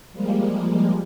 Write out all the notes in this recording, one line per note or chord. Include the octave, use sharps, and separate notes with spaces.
F3 G3 G#3 A#3